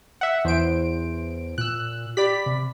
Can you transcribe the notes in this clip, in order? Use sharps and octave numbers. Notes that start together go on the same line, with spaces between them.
E5 F#5
E2 C5 D7
A#2 E6 F#6
G4 D5 B5 B6
C3